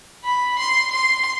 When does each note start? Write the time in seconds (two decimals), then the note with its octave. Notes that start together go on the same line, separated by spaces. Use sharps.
0.25 B5
0.59 C6
0.91 C6